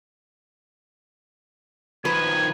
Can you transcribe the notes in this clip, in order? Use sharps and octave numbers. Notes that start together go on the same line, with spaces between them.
D#3 F3 B4 G#6